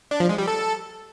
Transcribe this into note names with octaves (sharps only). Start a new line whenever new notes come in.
D4
F3
G#3
G3
A4